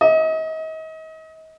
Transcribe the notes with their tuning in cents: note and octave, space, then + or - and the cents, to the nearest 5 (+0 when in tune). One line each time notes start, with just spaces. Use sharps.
D#5 +35